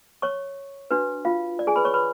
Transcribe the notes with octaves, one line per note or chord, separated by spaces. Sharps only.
C#5 C#6
D4 F#4 B4
F4 F5
D5
G#4 G#5
B4 B5
C#5 C#6
B4 B5